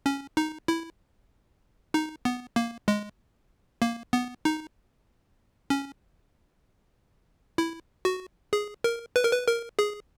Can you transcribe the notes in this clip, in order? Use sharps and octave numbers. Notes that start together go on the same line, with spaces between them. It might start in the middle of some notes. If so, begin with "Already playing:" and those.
C#4
D#4
E4
D#4
B3
A#3
G#3
A#3
B3
D#4
C#4
E4
F#4
G#4
A#4
B4
A#4
B4
A#4
G#4